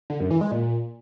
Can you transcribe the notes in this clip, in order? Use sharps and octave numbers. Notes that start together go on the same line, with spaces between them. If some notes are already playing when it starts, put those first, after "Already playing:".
D3
F#2
E3
G#3
A#2